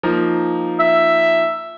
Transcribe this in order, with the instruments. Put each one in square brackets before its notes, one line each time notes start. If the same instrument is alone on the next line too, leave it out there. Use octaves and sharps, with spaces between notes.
[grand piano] F3 A#3 D#4
[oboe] E5